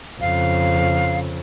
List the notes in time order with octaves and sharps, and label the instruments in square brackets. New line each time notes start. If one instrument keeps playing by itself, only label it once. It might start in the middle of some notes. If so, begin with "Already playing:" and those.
[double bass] F2 C#3 [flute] F5